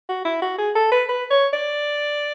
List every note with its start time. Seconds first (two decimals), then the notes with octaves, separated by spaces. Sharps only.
0.09 F#4
0.25 E4
0.42 F#4
0.59 G#4
0.76 A4
0.92 B4
1.09 B4
1.31 C#5
1.54 D5